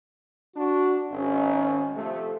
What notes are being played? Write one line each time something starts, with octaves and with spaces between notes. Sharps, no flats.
D4 F#4
G#1 C#4
C3 F3 A3